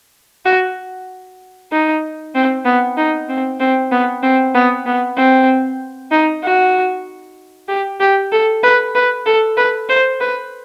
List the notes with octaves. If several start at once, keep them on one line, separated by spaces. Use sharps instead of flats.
F#4
D#4
C4
B3
D#4
C4
C4
B3
C4
B3
B3
C4
D#4
F#4
G4
G4
A4
B4
B4
A4
B4
C5
B4